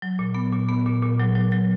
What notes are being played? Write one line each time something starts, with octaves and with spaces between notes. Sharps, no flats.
F#3
A#2
B3
A#2
B3
A#2
A#2
F#3
F#3
F#3